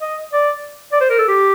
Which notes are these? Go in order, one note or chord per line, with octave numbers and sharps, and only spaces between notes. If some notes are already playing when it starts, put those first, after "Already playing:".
D#5
D5
D5
C5
A#4
A4
G4